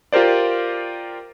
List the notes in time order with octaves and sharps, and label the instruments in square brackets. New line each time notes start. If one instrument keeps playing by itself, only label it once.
[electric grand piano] F4 G4 A#4 C5 D5